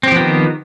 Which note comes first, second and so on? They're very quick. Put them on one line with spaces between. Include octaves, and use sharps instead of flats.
C4 G4 F3 B3 D#3